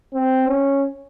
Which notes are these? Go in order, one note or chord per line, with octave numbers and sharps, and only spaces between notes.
C4
C#4